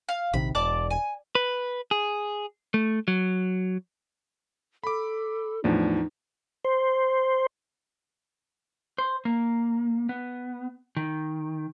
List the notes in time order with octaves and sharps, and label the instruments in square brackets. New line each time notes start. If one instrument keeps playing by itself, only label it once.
[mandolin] F5
[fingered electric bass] A#1 C3 D#3 [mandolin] B5
[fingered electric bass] E1 [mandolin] D5 A5 D6
[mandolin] G#5
[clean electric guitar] B4
G#4
A3
F#3
[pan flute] A4 [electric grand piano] B5 D6
[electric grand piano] E2 F3 D4 [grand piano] A2 [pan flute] D#4
[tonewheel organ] C5
[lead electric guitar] C5
A#3
B3
D#3